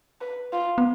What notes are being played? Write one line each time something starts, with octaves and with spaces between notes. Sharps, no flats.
B4
F4
B3